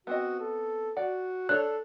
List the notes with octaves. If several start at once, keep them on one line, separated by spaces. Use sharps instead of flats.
B3 C4 F#4 D#5
A4
F#4 D5 F#5
D4 A4 C#5 F#6